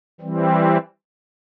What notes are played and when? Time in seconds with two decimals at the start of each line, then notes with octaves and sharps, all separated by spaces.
0.21 E3 G3 C4